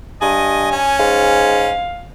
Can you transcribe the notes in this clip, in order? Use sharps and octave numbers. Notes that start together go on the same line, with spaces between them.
G2 D#5 G#5
C#4
G#2 F5